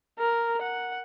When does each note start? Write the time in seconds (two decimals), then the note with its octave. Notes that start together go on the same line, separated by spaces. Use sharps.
0.19 A#4
0.62 F#5